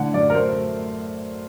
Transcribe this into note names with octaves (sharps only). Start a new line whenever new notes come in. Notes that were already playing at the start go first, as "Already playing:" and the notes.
Already playing: A2 D3 F#5
F#2 D5
A#4
A3 C5
A3